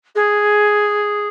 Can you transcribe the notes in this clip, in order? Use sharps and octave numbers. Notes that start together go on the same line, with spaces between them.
G#4